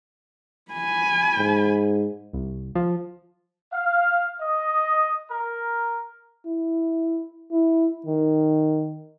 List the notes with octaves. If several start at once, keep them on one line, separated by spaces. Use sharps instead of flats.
G#5 B5
G#2
C2
F3
F5
D#5
A#4
E4
E4
D#3